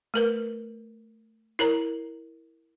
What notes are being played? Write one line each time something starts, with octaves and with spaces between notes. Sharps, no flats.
A3 A#4 B4
E4 A#4 C#5 A#5